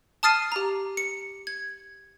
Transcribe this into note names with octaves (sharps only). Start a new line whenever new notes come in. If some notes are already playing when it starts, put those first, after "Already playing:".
A5 D#6 F6 A6 C7 D#7
G4 A#5
C#7
G#6